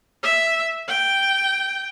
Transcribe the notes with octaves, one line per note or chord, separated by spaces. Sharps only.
E5
G5